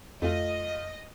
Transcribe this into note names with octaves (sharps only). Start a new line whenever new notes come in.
F2 A3 F4 D#5